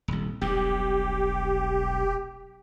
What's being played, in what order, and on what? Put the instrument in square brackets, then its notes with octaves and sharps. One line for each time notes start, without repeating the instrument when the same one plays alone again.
[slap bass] D#1 C2
[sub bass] E1 [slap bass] B1 G2 [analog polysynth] G4